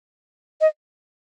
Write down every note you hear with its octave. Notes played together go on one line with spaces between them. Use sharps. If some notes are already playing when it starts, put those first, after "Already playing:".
D#5